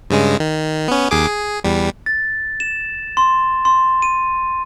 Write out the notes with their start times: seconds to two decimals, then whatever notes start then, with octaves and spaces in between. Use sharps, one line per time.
0.10 G2 C#3 G#3
0.40 D#3
0.88 B3 C#4
1.11 D#2 G#4 D6
1.26 G#4
1.64 E2 G3
2.06 A6
2.60 E7
3.17 C6
3.65 C6
4.02 D#7